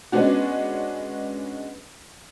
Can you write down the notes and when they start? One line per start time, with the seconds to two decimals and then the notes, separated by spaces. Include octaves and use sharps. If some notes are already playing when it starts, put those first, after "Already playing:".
0.12 G#3 B3 C#4 D4 F#4